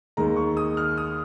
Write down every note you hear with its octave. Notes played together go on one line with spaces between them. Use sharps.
D#2 D#3 G#3 A#5
C#6
D#6
F6
D#6